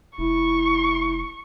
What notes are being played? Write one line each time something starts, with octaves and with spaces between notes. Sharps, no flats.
F1 E4 C#6